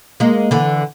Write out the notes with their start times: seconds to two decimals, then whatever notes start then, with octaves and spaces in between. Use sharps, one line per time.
0.20 G#3 A#3
0.51 D3 E3